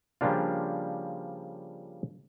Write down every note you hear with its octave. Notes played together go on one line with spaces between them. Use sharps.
C#3 F3 G3 A#3 D4 F4